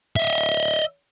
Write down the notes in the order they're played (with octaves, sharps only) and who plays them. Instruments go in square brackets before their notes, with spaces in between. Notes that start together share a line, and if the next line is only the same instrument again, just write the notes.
[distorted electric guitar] D#5 E5